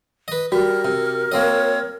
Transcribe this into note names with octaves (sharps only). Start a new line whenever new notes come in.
B4 D#5
G3 F#4 A#4
C3
A#3 C4 C#5 D#5